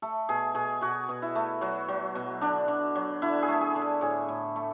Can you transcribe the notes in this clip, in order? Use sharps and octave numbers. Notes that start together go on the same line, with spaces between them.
A3 A4
B2 G#4
B2 G#4
B2 F#4
B2
E4
A3
F#3 F#4
F#3
B2
D3 D4
D3
F#3
D3 E4
G#4
A3
G#4
D3
A4
A2 G#4
A2
A3